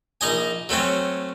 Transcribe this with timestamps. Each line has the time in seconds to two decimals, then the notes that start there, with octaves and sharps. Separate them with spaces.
0.21 A#1 D#4 D#5 G#5
0.69 F#3 A3 C4 C#4